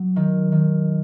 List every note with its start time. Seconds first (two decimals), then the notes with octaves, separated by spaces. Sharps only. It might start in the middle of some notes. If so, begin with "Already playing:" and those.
Already playing: F#3
0.16 D#3
0.52 D#3